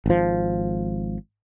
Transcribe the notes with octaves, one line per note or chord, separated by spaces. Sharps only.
G#1 F3